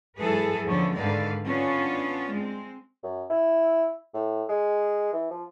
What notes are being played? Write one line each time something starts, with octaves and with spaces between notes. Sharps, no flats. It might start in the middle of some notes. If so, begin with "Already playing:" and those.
G#2 E3 F#3 G#4 A4 B4
E2 D3 F3 B3 C#4
G#2 D3 D#3 B4 D5 F5
B3 C#4 D4 F4
G#3 C4
F#2
E4
A2
G#3
E3
F3